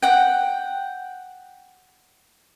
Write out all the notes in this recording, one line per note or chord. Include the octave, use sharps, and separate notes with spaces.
F#5 G5